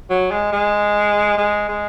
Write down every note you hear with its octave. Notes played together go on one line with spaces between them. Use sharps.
F#3
G#3
G#3
G#3
G#3